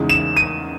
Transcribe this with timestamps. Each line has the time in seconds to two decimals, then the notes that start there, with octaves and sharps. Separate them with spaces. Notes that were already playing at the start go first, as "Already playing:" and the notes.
Already playing: E2 C#3 G#3 D#4
0.09 E7
0.37 D#7